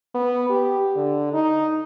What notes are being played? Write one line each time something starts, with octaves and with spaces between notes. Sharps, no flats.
B3
G4
D3
D#4